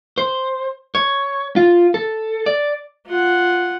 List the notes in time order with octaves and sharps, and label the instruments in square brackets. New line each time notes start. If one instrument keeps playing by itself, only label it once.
[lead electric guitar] C5
C#5
F4
A4
D5
[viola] F4 F#5